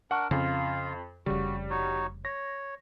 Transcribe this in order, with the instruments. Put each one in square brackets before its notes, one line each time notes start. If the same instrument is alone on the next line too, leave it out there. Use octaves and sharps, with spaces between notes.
[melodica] D4 A#4 [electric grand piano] F#5 C#6
[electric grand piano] F2 [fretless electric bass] C#3 C#4 [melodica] F4 F5
[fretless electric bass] F1 C#3 [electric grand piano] G3 [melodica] F#4
[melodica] D#4 F#4 C#5
[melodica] C#5 [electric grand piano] A#6